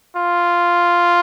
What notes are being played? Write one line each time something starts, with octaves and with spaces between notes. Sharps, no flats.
F4